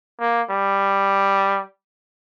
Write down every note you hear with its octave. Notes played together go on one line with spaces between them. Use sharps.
A#3
G3